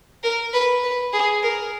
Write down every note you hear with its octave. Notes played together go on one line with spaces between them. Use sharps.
A#4
B4
B4
G#4
A#4